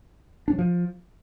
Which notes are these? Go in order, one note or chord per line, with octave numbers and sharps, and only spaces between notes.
D4
F#3
F3